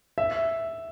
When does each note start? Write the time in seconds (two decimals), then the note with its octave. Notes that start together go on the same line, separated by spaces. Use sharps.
0.18 E5